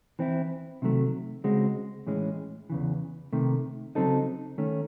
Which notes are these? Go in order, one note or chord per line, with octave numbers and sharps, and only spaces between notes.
E3 C4 E4
C3 D#3 F#3 A3
C#3 G#3 C4 F#4
A2 E3 G#3 C#4
E2 C#3 E3
C3 D#3 A3
C#3 F#3 C4 D#4 A4
D#3 A3 C#4